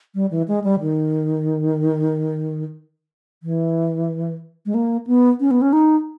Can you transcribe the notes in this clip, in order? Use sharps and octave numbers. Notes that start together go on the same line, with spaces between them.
G3
E3
G#3
G3
D#3
E3
G#3
A#3
B3
C#4
B3
C#4
D#4